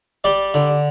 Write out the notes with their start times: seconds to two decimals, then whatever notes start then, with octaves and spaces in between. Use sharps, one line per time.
0.24 G3 D5
0.54 D3